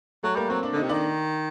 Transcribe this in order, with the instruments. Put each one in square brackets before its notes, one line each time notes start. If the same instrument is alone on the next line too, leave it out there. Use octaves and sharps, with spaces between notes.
[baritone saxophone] F#3 [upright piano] A3 A4
[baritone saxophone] G3 [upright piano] A#3 A#4
[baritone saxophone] F#3 [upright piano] C4 C5
[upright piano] D4 D5
[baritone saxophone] D3
[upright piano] D#4 D#5
[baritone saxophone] C3
[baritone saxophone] D#3 [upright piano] D4 D5